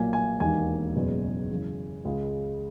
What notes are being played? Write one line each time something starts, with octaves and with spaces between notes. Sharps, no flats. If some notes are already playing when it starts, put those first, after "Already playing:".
Already playing: B1 A#2 A#3 G#5
G#5
E1 D#2 D#3 A#3 G#5
F#1 E2 B2 G#3
F#2 C#3 E3
C#2 C#3 G#3